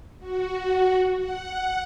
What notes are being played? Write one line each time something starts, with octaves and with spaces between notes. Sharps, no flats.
F#4
F#5